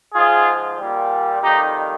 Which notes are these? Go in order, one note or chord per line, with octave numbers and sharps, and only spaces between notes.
G#2 F3 F4 G#4
A#2 G3
F2 D#3 G3 D#4 G4